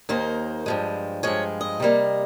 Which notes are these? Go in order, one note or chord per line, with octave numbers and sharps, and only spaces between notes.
D#2 D#3 A#3 C5
G2 F3 G#3
G2 F3 G#3 C#5
D#5
C3 G3 A#3